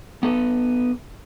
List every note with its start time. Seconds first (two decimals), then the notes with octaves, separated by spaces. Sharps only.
0.23 B3 A4 B4